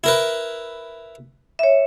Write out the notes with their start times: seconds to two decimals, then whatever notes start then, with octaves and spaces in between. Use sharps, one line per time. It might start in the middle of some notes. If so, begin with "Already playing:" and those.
0.04 E4 A#4 B4
1.59 C#5 E5